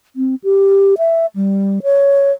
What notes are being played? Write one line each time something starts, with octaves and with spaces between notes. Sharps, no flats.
C4
G4
E5
G3
C#5